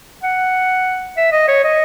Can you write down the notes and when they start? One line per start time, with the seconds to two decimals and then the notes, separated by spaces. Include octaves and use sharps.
0.23 F#5
1.17 E5
1.32 D#5
1.48 C#5
1.64 D#5